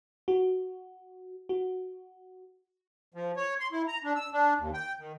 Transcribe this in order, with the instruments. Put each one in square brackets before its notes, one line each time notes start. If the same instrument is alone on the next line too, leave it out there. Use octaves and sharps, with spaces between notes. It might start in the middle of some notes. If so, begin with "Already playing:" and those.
[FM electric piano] F#4
F#4
[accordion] F3
C#5
C6
E4
A#5
D4
E6
D4
D#2
G5
D#3